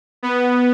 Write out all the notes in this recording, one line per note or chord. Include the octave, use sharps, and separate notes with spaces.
B3